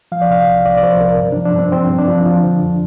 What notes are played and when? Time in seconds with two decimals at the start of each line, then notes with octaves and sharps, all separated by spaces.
0.12 F3 F5
0.21 D5
0.30 C3 F5
0.48 C2
0.66 C2 D5
0.77 D5
0.83 F3 C5
1.01 C3 A#4
1.18 G2
1.32 F3 D4
1.45 D4
1.54 G2 C4
1.72 F3 C4
1.90 G2
1.99 D4
2.08 F3
2.25 F3
2.43 D3
2.61 F2